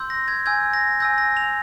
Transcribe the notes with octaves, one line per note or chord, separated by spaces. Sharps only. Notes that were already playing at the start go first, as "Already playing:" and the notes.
Already playing: C6 E6 G6
A#6
G#6
G#5 E6 G6 G#6
A#6
G#5 E6 G6 A#6
A#6
F7